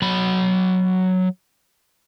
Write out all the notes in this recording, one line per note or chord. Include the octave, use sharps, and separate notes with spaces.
F#3 B5